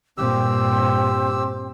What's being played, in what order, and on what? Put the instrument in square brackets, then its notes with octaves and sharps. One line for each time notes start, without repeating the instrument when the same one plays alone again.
[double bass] G2 A#2 [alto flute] C4 [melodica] G4 E6